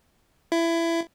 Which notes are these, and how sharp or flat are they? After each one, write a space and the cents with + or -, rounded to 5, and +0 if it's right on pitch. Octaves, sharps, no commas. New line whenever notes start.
E4 +20